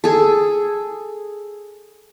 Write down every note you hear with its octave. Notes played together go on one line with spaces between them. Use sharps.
G#4 A4